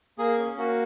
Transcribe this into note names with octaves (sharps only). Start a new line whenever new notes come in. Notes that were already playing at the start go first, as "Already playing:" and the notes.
A#3 G#4
C#4
A#3 F#4